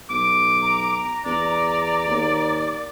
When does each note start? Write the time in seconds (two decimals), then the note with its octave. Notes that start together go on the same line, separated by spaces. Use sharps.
0.10 B1 D6
0.62 A#5
1.25 E2 D5
2.08 D#2